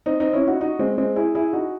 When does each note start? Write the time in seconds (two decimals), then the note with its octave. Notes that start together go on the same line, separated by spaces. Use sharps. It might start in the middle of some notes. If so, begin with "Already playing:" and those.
0.06 C4 D#4
0.20 C4 D#4
0.33 C#4 E4
0.47 D#4 F#4
0.61 D#4 F#4
0.79 G#3 C4
0.98 G#3 C4
1.16 E4 G#4
1.35 E4 G#4
1.53 D#4 F#4